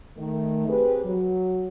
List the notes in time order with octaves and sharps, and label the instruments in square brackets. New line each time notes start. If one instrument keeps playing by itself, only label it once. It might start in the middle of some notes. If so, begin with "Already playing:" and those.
[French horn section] D#3 A3
C4 G4 G#4 B4
F#3